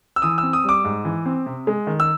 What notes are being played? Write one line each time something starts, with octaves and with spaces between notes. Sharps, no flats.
E6
E3 D#6
C4 E6
D#6
G3 D6
G#2
E3
C4
C3
G#3
D#3
E6